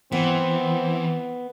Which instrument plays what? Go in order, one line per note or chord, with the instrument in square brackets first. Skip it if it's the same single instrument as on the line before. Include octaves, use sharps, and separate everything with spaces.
[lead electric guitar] E3 [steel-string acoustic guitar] B3 F#5 [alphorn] C4